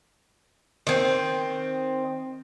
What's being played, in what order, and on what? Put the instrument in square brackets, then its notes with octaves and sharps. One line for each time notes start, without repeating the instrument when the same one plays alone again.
[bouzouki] D#3 C4